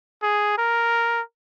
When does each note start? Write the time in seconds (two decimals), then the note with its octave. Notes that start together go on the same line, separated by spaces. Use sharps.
0.22 G#4
0.58 A#4